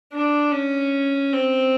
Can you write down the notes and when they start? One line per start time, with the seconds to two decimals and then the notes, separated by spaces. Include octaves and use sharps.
0.13 D4
0.52 C#4
1.33 C4